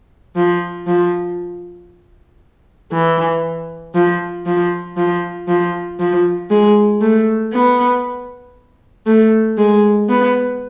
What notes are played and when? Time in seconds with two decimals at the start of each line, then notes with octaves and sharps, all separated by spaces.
0.36 F3
0.87 F3
2.93 E3
3.95 F3
4.46 F3
4.97 F3
5.48 F3
6.00 F3
6.50 G#3
7.01 A3
7.53 B3
9.06 A3
9.58 G#3
10.09 B3